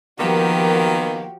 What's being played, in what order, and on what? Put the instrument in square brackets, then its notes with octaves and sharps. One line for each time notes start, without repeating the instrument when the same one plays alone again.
[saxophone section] D#3 A#3 B3 [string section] F3 F#4 G4